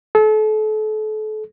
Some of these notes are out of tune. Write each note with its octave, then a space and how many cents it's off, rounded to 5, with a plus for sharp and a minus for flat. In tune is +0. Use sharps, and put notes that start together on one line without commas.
A4 -35